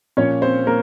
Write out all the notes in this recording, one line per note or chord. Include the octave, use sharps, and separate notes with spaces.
A#2 F3 C#4 C#5
C4 C5
A#3 A#4